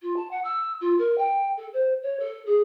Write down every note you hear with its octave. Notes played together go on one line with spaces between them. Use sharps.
F4
A5
F#5
E6
F4
A#4
G5
A4
C5
C#5
A4
G#4